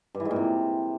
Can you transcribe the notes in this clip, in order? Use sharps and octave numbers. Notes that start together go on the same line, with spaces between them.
G2
E3
G#2
A#2
C3